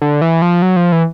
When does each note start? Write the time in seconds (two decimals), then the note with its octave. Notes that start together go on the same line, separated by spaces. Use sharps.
0.02 D3
0.21 E3
0.42 F3
0.62 F#3
0.76 F3
0.92 E3